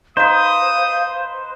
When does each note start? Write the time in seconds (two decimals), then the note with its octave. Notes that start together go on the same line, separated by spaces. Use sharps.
0.17 D#4 B4 C5 F5 D#6